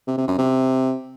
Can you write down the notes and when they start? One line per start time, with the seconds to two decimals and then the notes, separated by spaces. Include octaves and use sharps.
0.08 C3
0.18 C3
0.28 F#2
0.38 C3